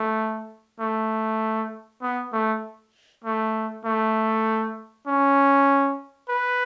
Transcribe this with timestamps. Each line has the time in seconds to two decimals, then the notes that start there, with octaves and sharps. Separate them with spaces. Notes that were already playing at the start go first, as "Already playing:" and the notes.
Already playing: A3
0.79 A3
2.02 B3
2.32 A3
3.24 A3
3.85 A3
5.07 C#4
6.29 B4